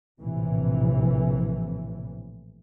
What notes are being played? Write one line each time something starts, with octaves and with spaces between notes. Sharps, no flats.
A#1 A2 C3 E3